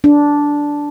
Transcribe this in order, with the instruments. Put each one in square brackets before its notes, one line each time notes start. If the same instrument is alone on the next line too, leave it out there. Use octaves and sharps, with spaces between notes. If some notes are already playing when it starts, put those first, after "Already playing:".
[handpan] D4